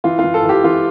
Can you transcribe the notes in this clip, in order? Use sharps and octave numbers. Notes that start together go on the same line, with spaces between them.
E3 F4
F4
E3
A4
E3
G4
E3 F4